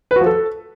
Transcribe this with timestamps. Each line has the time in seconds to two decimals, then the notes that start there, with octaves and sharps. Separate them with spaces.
0.11 B4
0.16 F#4
0.21 F3
0.26 A4